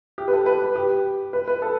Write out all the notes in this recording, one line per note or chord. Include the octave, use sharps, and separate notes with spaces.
G4
B4
A4
B4
G4
B4
B4
A4